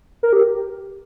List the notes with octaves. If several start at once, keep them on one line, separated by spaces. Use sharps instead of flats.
A#4
G4